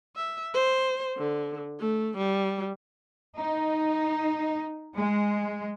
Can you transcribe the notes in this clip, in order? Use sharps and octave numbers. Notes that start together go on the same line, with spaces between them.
E5
C5
D3
A3
G3
D#4
G#3